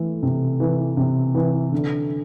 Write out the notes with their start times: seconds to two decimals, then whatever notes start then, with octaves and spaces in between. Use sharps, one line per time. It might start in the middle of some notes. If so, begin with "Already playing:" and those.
Already playing: E3 A3
0.23 C3
0.60 E3
0.97 C3
1.35 E3
1.72 D3